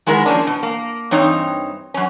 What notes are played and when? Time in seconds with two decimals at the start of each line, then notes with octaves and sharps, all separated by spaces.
0.07 D#3 G#3 B3 E4 A#4
0.26 F3 A#3 C#4 D4
0.47 B2
0.63 A#3
1.11 G2 E3 C4 D#4 C#5
1.94 F#2 C#4